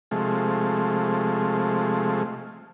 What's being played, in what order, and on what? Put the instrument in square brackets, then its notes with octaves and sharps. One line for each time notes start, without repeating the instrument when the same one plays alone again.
[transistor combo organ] C3 F3 G#3 A3